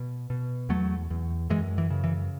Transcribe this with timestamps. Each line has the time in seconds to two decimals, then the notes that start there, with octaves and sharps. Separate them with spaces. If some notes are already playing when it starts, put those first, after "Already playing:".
Already playing: B2
0.30 B2
0.69 E2 F#3 A3
1.10 E2
1.50 F#2 E3 G#3
1.78 E3
1.90 C#3
2.04 E3